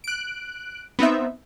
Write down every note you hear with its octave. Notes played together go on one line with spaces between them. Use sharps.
F#6 D7
B3 C4 D#4 E5